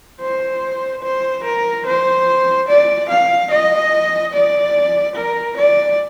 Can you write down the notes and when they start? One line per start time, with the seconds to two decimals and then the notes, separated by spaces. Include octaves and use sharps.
0.21 C5
1.03 C5
1.44 A#4
1.86 C5
2.68 D5
3.09 F5
3.51 D#5
4.33 D5
5.15 A#4
5.57 D5